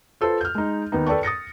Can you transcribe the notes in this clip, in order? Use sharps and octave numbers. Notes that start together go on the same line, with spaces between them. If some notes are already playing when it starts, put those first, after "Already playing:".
F4 A4 B4 C5
F6 G6
G#3 D#4
D#2 B3 D#4
A4 B4 D5 G5 A5 C#6
D#6 A6 A#6 C#7